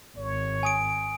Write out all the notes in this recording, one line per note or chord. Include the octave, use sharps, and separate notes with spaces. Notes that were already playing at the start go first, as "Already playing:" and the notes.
G#1 C#5
G#5 D#6 D7